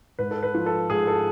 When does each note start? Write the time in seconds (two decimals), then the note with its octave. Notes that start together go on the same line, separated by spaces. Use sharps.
0.19 G#2 B4
0.31 A4
0.43 B4
0.55 F3
0.66 A4
0.90 G#2 G#4
1.07 A4